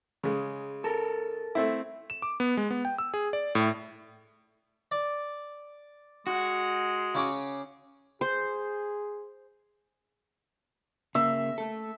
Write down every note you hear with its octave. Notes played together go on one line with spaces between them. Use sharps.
C#3 G#3
A4 A#4
A3 C4 E4
E7
D6
B3
G#3
B3
G5
E6
G#4
D5
A2
D5
G#3 F#4
C#3 C#4 D6
G#4 C5
C#3 A#3 E5
A3 A4